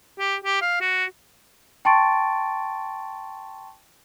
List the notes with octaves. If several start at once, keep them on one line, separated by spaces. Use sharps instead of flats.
G4
G4
F5
F#4
G5 A5 C6 C#6 A6 D7